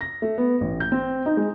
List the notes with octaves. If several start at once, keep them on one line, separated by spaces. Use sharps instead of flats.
A#6
A3
B3
A1
G6
C4
D#4
G#3